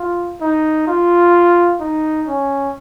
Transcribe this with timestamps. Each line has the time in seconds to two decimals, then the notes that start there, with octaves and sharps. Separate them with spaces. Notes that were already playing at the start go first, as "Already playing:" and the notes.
Already playing: F4
0.41 D#4
0.87 F4
1.80 D#4
2.27 C#4